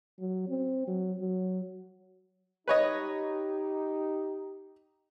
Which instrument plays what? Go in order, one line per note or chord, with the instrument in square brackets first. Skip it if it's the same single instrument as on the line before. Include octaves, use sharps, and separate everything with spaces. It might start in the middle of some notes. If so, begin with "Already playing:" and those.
[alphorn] F#3
C4
F#3
F#3
[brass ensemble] D#4 G4 [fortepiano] B4 C#5 D#5